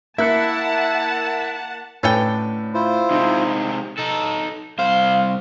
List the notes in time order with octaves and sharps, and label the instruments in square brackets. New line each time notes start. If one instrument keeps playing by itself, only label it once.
[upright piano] A#3 F#6 C#7 [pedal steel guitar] E4 [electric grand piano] E5 [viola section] F#5 A5
[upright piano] A2 B4 A6 [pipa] D3 C#4 G5
[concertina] E4 F4 C5
[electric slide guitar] C3 G#3 [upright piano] D#4
[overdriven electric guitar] D#4 A4
[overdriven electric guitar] C2 C5 [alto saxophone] F5